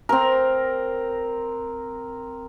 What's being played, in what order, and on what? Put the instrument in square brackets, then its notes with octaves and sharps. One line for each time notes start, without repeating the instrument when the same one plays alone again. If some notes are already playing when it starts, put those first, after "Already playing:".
[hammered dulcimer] C4 A#4